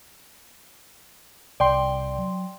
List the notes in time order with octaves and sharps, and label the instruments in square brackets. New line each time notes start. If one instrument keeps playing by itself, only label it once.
[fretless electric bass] C2 [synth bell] D5 G5 C6
[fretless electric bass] F#3